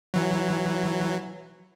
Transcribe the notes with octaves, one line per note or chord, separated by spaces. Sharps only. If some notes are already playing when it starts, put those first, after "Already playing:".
E3 F#3